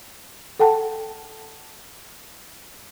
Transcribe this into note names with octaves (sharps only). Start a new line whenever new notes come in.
A4 F#5 G5 A5